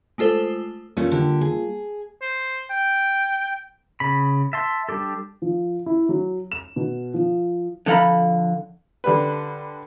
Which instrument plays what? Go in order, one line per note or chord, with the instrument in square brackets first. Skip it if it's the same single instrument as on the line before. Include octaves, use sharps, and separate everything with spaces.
[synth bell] G#3 A3 F4 A4 C5
[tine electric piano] G3 A#3 F4 [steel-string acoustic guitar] A3 C#4
[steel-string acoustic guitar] D3 G4
G#4
[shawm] C5
G5
[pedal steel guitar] C#3 B5
E5 A5 C6
G3 D4 G4 A4
[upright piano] F3
E4
F#3
E7
B2
F3
[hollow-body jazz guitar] D3 F3 A4 F5 A#5 B5
[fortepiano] D3 G3 B4